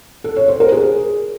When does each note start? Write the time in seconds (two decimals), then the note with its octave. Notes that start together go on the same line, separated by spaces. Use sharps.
0.24 A4
0.36 C#5
0.48 C5
0.60 A#4
0.72 G#4